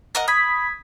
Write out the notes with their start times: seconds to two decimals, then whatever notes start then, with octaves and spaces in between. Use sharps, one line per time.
0.15 A#4 D#5 F#5
0.28 B5 D#6 G#6 B6